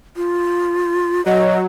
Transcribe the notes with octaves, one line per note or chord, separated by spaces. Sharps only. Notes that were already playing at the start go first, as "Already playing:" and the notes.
F4
F#3 D#5